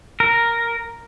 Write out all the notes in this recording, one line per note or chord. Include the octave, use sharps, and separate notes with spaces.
A#4